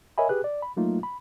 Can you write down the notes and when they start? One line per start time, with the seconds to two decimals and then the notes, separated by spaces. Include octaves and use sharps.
0.18 A#4 C#5 D#5 E5 G#5 B5
0.29 G4 G#4 B4 F#6
0.44 D5
0.62 B5
0.77 F#3 A3 A#3 D#4 F4
1.03 B5